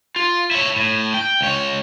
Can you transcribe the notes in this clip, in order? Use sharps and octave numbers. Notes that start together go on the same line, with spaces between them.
F4
E4 C#5
A2
G5
C#2 C#5